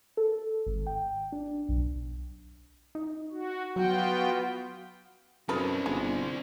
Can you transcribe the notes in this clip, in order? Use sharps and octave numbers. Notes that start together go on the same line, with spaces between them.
A4
G#1
G5
D4
B1
D#4
F#4
F#3 B3 F4 F#4 G5
F#2 D#3 C4 E4 A4 B4
G1 G#3